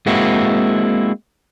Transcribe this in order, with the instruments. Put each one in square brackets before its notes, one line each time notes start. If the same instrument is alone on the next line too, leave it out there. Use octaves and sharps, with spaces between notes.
[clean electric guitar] G#3 A#3 C4 E4 F#4